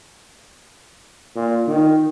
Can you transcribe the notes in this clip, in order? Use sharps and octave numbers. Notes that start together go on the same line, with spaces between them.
A#2
D#3